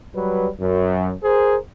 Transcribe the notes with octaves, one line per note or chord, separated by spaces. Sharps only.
F#3 G3 B4
F#2
G#4 A#4 C5